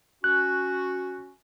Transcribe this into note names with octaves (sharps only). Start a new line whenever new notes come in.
C#4 F#4 F#6